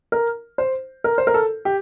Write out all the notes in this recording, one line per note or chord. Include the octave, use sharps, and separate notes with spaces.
A#4
C5
A#4
C5
A#4
A4
G4